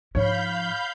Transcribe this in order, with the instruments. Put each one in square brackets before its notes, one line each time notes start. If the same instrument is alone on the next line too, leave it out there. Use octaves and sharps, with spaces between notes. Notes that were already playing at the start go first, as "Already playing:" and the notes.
[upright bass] G#2 F3 [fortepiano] C#5 [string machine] F5 B5 G6